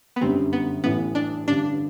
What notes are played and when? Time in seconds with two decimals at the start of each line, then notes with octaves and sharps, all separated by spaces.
0.16 B3
0.21 G1 F#2 D3 G3 C4
0.53 B3
0.84 A1 A2 E3 B3
1.15 D4
1.47 A1 G2 D3 D4